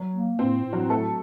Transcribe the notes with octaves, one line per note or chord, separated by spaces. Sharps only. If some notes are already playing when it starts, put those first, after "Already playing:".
Already playing: F#3
A#3
A2 C4
A2
F#3 F#4
F#3 A3 A4